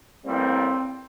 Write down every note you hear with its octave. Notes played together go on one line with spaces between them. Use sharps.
A1 A2 G3 A#3 C4